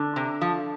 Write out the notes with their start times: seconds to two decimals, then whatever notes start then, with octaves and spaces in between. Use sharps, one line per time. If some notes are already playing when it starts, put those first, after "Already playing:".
Already playing: D3 D4
0.16 C3
0.41 F3